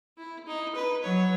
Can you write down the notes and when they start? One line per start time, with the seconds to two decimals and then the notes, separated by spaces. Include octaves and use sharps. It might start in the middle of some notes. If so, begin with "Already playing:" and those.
0.18 E4
0.47 D#4
0.75 B4
1.04 F#3 C#5